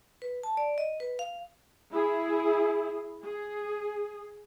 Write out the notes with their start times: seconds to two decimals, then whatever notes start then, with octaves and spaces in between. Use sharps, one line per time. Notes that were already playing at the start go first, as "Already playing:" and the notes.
0.22 B4
0.43 A5
0.57 D5
0.78 D#5
1.00 B4
1.19 F5
1.92 E4 G#4
3.22 G#4